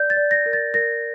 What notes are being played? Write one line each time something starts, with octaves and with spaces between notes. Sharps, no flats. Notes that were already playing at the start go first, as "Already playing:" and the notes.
Already playing: D5 G6
A6
D5
A#6
A#4
A6
A#4 A#6